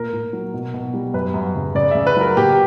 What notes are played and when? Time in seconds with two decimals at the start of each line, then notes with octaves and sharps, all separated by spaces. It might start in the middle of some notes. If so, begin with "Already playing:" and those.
Already playing: A#2 A#4
0.13 A#2
0.33 F#3
0.54 B2
0.74 B2
0.94 G3
1.14 F#2 B4
1.34 F#2
1.55 C#3
1.75 C#3 D5
1.91 C#3 E5
2.07 B4
2.17 F#3 A#4
2.36 A#2 G4